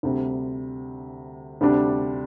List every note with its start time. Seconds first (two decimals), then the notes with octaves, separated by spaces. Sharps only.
0.03 D2 C3 G3
1.61 D2 C3 G3 D4